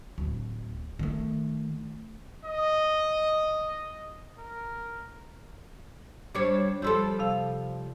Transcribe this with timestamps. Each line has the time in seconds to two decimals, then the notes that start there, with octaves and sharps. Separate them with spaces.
0.18 D1
0.99 D#3 A3
2.45 D#5
4.39 A#4
6.35 G3 D4 C5 C#5 D6
6.82 F3 G3 A4 C6 E6 G6
7.19 C3 F5